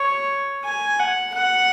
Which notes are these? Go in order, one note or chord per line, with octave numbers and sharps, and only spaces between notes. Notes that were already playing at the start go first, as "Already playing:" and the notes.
Already playing: C#5
G#5
F#5
F#5